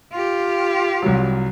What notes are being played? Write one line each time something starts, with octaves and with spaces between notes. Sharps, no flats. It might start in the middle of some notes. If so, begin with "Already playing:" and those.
F4 G4
C2 F#3